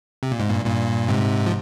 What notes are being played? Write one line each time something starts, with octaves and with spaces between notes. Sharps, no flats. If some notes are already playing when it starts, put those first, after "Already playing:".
C3
A#2
G#2
G2 A#2
G2 A#2
G#2 C3
F3